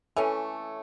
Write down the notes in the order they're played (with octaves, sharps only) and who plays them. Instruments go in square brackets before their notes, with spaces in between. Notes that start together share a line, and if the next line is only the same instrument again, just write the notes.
[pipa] E3 A3 C#4 [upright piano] A4 C#5